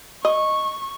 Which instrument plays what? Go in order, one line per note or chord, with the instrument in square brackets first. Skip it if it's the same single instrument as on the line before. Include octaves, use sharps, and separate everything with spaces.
[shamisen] D#5 [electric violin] C#6